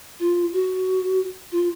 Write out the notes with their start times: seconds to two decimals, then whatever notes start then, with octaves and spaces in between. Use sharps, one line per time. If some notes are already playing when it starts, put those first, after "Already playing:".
0.20 F4
0.53 F#4
1.52 F4